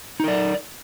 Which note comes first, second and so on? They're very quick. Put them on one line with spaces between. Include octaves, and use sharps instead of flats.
D#4 A#4 D5